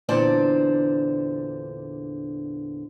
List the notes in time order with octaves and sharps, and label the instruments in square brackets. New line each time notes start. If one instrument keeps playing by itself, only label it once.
[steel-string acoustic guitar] E2 A#2 D3 C5 D5 A5